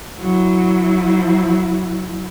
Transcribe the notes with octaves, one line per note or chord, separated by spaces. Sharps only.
F#3 E4